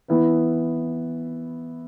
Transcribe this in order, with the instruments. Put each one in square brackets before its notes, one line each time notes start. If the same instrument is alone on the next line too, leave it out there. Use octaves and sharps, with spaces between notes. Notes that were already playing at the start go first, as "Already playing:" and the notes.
[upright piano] E3 B3 E4 B4